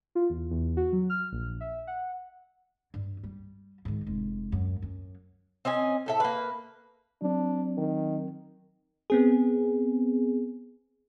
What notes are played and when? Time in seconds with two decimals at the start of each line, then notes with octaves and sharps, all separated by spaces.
0.15 F4
0.30 E2
0.51 E2
0.77 F#4
0.92 F#3
1.10 F6
1.32 A#1
1.60 E5
1.87 F#5
2.94 G2
3.23 G3
3.85 G#2 D#3
4.06 F1 G#3
4.52 F#2
4.82 F#2
5.65 C4 C#4 D#5 G#5
6.06 A2 A4 E5
6.20 A#3 B4
7.22 F#3 C4 D4
7.77 D#3
9.10 B3 C4 G#4